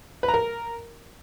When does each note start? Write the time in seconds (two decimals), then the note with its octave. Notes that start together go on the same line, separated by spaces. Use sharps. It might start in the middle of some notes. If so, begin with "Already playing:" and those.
0.23 B4
0.28 A#5
0.34 A#4